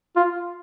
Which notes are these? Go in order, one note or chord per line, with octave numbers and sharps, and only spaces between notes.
F4